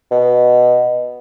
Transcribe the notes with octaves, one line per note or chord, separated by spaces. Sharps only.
B2